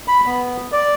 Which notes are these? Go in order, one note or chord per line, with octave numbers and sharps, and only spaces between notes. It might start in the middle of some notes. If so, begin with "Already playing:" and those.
B5
B3
D5